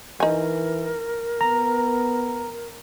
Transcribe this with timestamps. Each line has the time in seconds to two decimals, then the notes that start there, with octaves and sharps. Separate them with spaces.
0.20 E3 D#4 A#4 G#5
1.41 B3 A#5